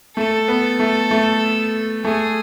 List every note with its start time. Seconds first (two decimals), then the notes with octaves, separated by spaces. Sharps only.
0.17 A3 A4
0.48 B3
0.80 A3
1.11 A3
2.05 A3 G#4